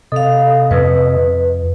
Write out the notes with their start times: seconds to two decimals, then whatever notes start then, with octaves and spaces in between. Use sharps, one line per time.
0.12 C3 A4 D#5 F5
0.71 F2 B4